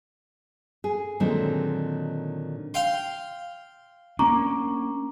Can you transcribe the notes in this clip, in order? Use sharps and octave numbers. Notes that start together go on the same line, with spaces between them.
G#4
A#2 D3 D#3 F#3 G#3 C4
F5 G5 C6
A#3 C#4 D4 A#5 C#6 D6